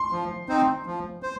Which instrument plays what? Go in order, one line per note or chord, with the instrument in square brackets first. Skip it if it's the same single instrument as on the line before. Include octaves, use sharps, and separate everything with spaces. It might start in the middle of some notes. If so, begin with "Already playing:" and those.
Already playing: [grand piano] C6
[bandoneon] F3
C4 D#4 C5
F3
C5